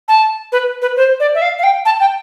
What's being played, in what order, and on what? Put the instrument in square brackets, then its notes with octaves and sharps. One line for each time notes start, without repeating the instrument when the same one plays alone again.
[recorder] A5
B4
B4
C5
D5
E5
F5
F5
G5
A5
G5